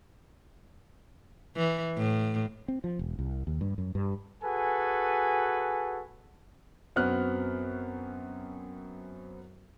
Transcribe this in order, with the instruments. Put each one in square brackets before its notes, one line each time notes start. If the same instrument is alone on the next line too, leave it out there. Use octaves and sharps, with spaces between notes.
[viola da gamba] E3
A2
[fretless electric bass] C4
F3
E1
C2
D#2
G2
F#2
G2
[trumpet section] F#4 G#4 A4 B4 G#5
[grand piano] F#2 B3 C4 F#4 F6 F#6